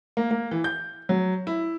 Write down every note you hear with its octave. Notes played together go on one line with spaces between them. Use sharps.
A#3
A#3
E3
G6
F#3
E4